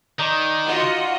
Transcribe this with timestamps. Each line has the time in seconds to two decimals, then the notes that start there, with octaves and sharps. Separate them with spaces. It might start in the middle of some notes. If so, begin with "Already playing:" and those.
0.19 D#3 D#4 D5
0.66 F4 F#4 D#5